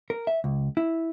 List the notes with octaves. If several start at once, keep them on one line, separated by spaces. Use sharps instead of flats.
A#4
E5
C#2
E4